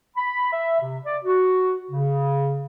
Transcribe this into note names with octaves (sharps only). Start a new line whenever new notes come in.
B5
E5
C3
D5
F#4
C#3